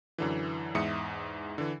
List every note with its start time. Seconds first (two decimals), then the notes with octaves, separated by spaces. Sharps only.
0.18 F#2 D3 E3
0.75 E2 G#2 E5 D#6 C#7
1.58 D3 E3